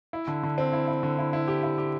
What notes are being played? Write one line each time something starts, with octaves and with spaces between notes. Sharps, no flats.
E4
D3
D3
C4
E4
E4
D3
E4
E4
G4
E4
G4